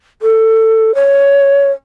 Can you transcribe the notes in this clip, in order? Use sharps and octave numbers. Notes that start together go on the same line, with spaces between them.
A4
C#5